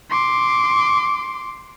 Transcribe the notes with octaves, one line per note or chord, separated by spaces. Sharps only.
C6 D6